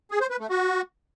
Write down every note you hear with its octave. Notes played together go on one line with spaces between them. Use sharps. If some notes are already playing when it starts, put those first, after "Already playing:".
G#4
C5
B4
A3
F#4